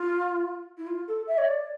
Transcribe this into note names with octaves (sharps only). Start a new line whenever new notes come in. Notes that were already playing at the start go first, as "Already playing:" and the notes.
Already playing: F4
E4
F4
A4
E5
C#5
D5